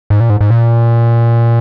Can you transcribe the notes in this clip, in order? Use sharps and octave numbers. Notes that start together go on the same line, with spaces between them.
G#2
A#2
G#2
G#2
A#2